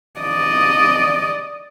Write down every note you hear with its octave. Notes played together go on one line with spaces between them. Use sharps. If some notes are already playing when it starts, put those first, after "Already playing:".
D5 D#5